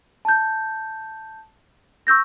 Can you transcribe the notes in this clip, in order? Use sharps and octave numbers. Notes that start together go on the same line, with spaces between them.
A5 G6
C#6 E6 G6 A#6